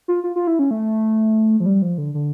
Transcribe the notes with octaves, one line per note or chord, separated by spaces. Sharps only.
F4
F4
F4
E4
C#4
A3
F3
G3
F3
D3
D3